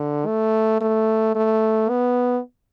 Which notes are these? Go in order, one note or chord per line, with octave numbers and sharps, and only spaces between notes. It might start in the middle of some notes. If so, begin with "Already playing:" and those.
Already playing: D3
A3
A3
A3
B3